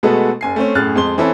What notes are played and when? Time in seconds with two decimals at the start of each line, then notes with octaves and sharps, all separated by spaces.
0.03 B2 G#3 A3 B3 F#4 A4
0.41 F#1 G#5 C7
0.56 A3 C4 C#4
0.75 F#2 A2 G#4 F6 F#6 A6
0.95 F2 G#3 C6 G7
1.18 E3 C4 C#4 E4 A4